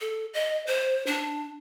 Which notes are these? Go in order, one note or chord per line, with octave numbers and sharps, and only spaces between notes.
A4
D#5
C5
D4